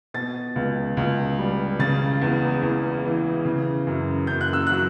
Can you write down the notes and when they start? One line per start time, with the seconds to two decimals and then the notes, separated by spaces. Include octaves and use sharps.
0.14 B2 A6
0.56 C#2
0.97 C#2
1.39 G3
1.79 C#3 A6
2.21 E2
2.62 E2
3.04 E3
3.45 C#3
3.87 F#2
4.27 F#2 G6
4.41 F#6
4.53 E6
4.67 F#3 F#6